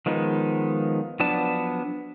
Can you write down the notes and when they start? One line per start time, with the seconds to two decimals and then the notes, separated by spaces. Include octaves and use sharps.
0.06 D#3 F3 G#3 B3 D#4
1.20 F3 F#3 B3 D4 A5